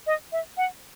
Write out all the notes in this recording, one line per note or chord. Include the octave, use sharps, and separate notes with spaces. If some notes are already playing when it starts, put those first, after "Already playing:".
D#5
E5
F#5